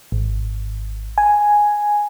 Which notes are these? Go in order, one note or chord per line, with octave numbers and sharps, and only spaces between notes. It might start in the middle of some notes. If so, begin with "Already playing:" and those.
G#1
G#5